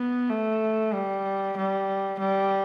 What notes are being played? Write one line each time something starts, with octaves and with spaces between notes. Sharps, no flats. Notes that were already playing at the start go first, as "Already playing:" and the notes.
Already playing: B3
A3
G3
G3
G3